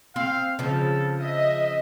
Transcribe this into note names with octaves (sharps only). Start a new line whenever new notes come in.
C4 F5
C#3 F3 A4
D#5 E5